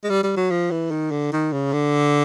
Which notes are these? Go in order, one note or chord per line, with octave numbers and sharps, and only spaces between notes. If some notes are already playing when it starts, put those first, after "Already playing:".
G#3
G3
G3
F#3
F3
E3
D#3
D3
D#3
C#3
D3